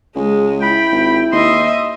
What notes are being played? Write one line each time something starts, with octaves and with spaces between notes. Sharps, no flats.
C#2 G#3 G#4
E4 G5 B5
G#1
D#2 D#5 E5 C6